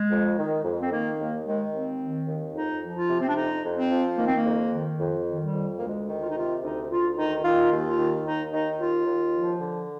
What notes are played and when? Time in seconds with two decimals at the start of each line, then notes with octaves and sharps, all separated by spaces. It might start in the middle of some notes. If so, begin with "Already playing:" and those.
Already playing: G#3
0.11 F2
0.38 D#3
0.65 F2
0.83 C4
0.92 D#3 A#3
1.19 D#2 A#3
1.46 D#3 G#3
1.74 D#2 C4
2.01 D#3
2.28 D#2
2.55 F2 D#4
2.82 F3
2.95 F4
3.10 C3
3.22 C4
3.29 D4
3.36 F2 D#4
3.64 F2
3.77 C4
3.91 F3
4.18 D#3 A#3
4.28 C4
4.37 A#3
4.45 F2
4.73 D#3
4.99 F2
5.27 D#3
5.40 G3
5.54 F2
5.77 A#3
5.81 D2 G#3
6.08 D#3
6.22 F4
6.30 D#4
6.35 C3 F4
6.62 D2 D#4
6.90 D2 F4
7.17 D#3 D#4
7.44 D#3 F4
7.72 D#2
7.85 F4
7.98 D#3
8.26 D#2 D#4
8.52 D#3 D#4
8.80 D#2 F4
9.06 D#2
9.34 F3
9.61 D3